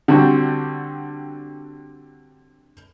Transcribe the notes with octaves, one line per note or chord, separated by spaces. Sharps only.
D3 G3 C4 F#4